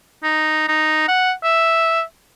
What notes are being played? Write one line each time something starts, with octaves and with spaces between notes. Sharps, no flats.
D#4
D#4
F#5
E5